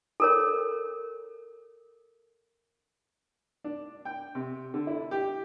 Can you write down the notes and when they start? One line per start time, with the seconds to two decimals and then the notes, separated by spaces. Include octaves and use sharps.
0.20 A4 A#4 C#5
3.64 D4
4.05 G5
4.35 C3
4.74 D3
4.87 E4
5.11 G4